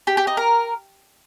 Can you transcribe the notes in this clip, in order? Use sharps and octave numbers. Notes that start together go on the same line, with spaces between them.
G4
G4
D#4
A#4